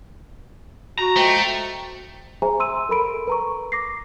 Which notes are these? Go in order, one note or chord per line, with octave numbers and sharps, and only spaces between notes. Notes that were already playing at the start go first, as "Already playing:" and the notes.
F#4 A#5
F3 G#3 A3 G5
G#4 C5 E5 G#5 A#5
C6 E6 D#7
A4 A#4 B5 D7
B4 A#5 C#6
D6 A#6 C7